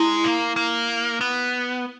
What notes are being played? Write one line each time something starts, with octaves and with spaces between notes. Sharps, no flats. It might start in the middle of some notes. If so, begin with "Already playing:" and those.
Already playing: G#3 E4
A#3
A#3
B3